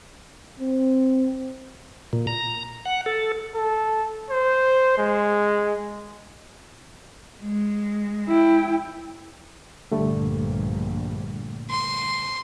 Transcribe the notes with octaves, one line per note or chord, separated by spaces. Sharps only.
C4
A#2
A#5
F#5
A4
A4
C5
G#3
G#3
E4 G5
A#1 G2 A#2 D3 G3 A3
C6